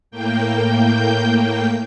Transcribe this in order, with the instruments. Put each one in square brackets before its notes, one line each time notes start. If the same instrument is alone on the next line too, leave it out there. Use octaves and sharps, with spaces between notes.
[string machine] A2 A#3 G5 G6